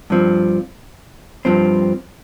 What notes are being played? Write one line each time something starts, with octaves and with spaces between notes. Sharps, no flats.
G2 F3 C4
G2 F3 C4